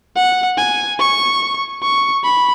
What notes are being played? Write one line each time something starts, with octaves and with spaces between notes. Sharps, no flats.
F#5
G#5
C#6
C#6
B5